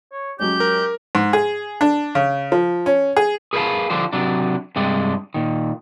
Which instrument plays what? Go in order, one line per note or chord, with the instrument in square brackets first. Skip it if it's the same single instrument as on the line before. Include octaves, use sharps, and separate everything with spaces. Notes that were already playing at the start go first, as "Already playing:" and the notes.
[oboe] C#5
[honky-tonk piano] F#3 G#3 C#4 [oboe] G4 [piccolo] G6
[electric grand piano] A#4
[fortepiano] G#2
G#4
D4
C#3
F3
C#4
G#4
[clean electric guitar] G#4 A#4 B4 C#5 F5 A5
D3 F3 D4 G4 C5
C3 F#3 D4
G2 C3 G#3 D4
A#2 D#3